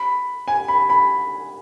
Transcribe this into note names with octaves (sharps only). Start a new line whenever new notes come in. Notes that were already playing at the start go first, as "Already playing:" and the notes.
Already playing: B5
G#5
B5
B5